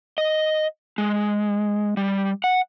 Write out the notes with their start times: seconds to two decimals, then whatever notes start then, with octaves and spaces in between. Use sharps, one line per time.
0.18 D#5
0.98 G#3
1.97 G3
2.44 F#5